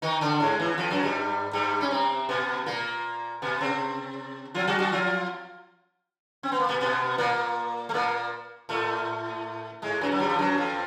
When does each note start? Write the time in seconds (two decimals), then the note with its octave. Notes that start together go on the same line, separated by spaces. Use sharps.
0.02 D#3 D#4
0.21 D3 D4
0.40 G#2 G#3
0.59 E2 E3
0.78 F2 F3
0.91 F#2 F#3
1.03 G2 G3
1.53 G2 G3
1.81 C#4
1.91 C3 C4
2.29 B2 B3
2.66 A#2 A#3
3.42 B2 B3
3.61 C3 C4
4.54 F3 F4
4.67 F#3 F#4
4.80 F#3 F#4
4.92 F3 F4
6.43 C4
6.52 B3
6.60 A#3
6.69 B2 B3
6.81 B2 B3
7.18 A#2 A#3
7.89 A3
7.94 A#2 A#3
8.69 A2 A3
9.82 G#2 G#3
10.01 F#2 F#3
10.12 F#3
10.20 G2 G3
10.30 F3
10.39 F#2 F#3
10.58 F2 F3